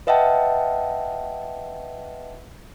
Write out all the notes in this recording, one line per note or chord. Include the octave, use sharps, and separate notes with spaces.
B4 D#5 E5 F#5 G5 A5